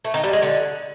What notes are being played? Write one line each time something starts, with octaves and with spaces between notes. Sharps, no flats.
A3
D#3
G3
G#3
D3